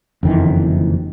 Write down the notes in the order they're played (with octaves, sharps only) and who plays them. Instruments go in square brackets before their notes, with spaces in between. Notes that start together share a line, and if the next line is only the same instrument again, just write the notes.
[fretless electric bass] F#1 F2 D#3 E3